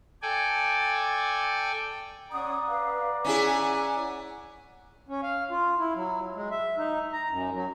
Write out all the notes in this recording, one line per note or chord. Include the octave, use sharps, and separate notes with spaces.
A4 D5 G5 G#5
C#4 D5 F#5 A#5 D#6
B4 F5
C#4 E4 G#4 G#5
C#4
F5
F4
E4
F#3
G#3
E5
D#4
A#5
F#2
F#3